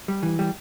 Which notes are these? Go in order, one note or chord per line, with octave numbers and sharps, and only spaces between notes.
G3
E3
G3